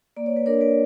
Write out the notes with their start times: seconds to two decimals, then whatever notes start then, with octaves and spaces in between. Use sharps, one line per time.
0.17 A#3 D5
0.26 C#5
0.36 B4
0.46 D4 A#4 C#5
0.61 B4 D5